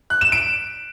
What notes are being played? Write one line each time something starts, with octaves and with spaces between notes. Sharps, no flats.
F#6
E7
D7